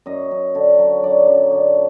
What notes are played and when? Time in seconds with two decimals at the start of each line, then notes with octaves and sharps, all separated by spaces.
0.06 F#2 D#5
0.31 F#2
0.55 D3
0.79 F#3
1.04 F#2 D5
1.27 F#2
1.52 D3